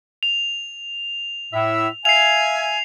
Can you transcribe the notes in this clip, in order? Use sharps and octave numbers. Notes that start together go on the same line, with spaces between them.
F7
A2 E5
E5 F5 G#5 C7 F7